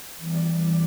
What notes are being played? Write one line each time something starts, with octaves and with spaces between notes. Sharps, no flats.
E2 E3 G3 D5
D5